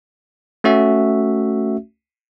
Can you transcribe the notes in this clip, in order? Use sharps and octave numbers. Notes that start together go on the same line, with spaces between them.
A3 C#4 F#4 E5